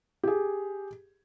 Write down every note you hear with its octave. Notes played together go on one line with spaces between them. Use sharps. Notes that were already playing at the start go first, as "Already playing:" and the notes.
G4 G#4